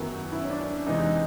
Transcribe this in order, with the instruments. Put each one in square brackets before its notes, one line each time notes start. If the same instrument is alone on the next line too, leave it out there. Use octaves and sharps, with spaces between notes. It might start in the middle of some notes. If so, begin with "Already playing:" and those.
Already playing: [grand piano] F#2 D#3 F#3 B3 [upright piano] E4
[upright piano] E4
C#4
D4
[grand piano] E2 C3 E3 G#3 B3 [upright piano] D#4